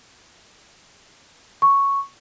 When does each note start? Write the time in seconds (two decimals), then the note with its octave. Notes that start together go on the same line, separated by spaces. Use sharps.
1.62 C#6